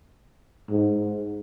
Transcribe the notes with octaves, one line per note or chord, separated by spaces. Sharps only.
G#2